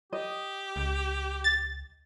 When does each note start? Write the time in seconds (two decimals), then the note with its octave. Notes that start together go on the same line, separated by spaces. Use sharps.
0.13 G4 D#5
0.76 C#2
1.44 A6